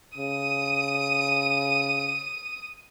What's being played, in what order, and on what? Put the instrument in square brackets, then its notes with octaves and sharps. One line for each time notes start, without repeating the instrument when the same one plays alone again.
[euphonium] C#3 [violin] D#6 D#7